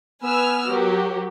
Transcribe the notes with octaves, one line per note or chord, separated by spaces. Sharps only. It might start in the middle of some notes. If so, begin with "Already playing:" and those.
B3 B4 G#5 E6 F6
F#3 F#4 G4 A#4